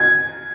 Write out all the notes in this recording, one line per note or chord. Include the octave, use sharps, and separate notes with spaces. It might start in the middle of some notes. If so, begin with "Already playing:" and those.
Already playing: G#6